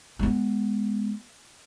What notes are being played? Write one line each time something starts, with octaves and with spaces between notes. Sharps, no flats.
G#3 B3